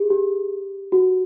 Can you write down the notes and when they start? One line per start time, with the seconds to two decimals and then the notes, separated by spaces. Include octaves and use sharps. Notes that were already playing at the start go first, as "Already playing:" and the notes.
Already playing: G4 G#4
0.10 G4
0.92 F#4